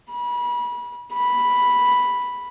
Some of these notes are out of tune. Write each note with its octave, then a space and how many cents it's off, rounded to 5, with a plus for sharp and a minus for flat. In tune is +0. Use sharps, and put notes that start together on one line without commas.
B5 -30
B5 +0